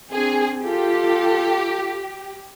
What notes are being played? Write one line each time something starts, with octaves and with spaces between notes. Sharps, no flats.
C4 D4 G#4
F4 G4 A4